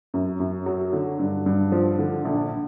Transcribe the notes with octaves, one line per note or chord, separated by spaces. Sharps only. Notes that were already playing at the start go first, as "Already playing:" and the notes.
F#2
F#2
F#3
D3
G2
G2
F3
D3
A#1